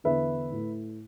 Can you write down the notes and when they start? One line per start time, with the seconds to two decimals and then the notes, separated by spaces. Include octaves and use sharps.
0.04 E2 D3 B3 B4 E5
0.50 A2 A3